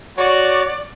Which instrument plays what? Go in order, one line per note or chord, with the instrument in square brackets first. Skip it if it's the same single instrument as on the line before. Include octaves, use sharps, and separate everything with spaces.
[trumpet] F#4 [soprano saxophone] C#5 [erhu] D5